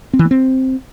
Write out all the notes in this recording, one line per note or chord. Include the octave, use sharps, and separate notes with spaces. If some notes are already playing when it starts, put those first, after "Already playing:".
C4
E3
A#3
C4